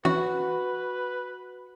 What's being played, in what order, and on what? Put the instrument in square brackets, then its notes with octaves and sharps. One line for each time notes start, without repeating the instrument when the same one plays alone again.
[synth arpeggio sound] E3 C#4 [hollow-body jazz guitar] F#4 [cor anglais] B4